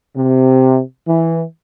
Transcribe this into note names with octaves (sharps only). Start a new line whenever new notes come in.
C3
E3